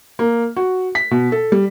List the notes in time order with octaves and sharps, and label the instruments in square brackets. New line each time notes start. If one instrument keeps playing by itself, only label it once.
[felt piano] A#3
F#4
B6
B2
A4
G3